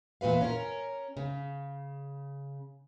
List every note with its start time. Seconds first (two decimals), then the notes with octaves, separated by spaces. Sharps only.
0.21 E2 A#2 F#4 B4 F5
0.41 C#4 A#4
1.17 C#3